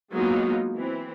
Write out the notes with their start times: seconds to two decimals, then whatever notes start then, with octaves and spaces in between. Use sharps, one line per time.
0.12 F#3 G#3 A#3 B3 D#4 F4
0.75 E3 C4